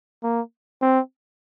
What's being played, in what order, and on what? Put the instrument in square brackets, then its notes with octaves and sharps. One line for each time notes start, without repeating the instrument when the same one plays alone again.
[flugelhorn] A#3
C4